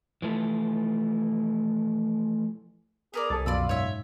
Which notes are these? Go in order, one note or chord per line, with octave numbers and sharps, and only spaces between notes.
E3 F3 A3
B3 G#4 A#4 D5
C2 A4 A6
F#2 B2 F4 D5 B5 E6
G#2 C#5 E5